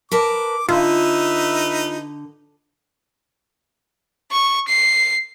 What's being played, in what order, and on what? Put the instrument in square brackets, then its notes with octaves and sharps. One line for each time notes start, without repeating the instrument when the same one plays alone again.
[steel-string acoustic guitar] A#4 B4 A5 [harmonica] D6
[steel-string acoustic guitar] D3 [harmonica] D#4 B4 E5 [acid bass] F4
[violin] C#6
C7